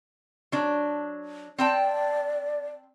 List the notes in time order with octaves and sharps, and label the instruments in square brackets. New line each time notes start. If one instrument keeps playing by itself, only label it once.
[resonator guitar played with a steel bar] F#3 D4
[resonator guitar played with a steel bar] C4 G5 A5 [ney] D5